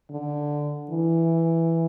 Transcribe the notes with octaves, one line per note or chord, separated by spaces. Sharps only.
D3
E3